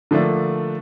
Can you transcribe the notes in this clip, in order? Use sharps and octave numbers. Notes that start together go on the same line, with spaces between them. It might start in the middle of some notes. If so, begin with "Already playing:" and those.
D3 F3 A3 A#3 D4